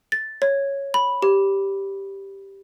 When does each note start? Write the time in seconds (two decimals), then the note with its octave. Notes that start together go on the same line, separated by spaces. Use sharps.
0.12 A6
0.42 C#5
0.94 B5
1.22 G4